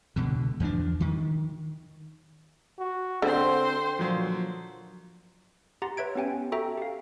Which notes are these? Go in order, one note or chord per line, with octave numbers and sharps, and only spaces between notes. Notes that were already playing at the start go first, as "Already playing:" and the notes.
C#2 B2 D3
E2 F3 G#3 D4
D#3
F#4
D3 C4 C5 C6
A#2 F3 F#3
G4 F#5 A#5 C6 A6 A#6
B4 C#5 E5 G#6 D7
B3 C#4 G4 G5 G#5
F#4 A4 E5 G5 A#5
G4 F5